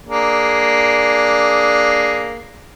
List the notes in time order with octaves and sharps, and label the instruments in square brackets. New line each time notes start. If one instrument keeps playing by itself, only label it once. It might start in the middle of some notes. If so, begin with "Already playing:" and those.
[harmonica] A#3 D4 G#4